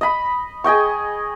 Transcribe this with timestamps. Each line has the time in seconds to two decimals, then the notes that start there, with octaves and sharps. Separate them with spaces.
0.01 D#5 B5
0.64 G#4 D#5 G5 C#6